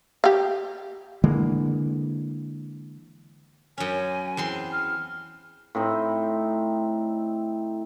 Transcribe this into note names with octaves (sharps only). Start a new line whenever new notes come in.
G4 F5
D3 E3 G#3 A#3
F#2 C#4 G#5
E2 C4 C6
F6
A2 C4 D#4